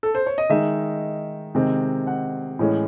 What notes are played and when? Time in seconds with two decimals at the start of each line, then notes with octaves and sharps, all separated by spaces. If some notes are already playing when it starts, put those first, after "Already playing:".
0.03 A4
0.15 C5
0.26 C#5
0.38 D#5
0.49 D#3 G#3 D#4 E5
1.55 C3 D#3 G#3 C4
2.07 F#5
2.59 A2 E3 G#3 C#4